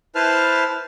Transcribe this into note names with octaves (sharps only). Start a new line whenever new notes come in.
E4 B4 C5 A5 F6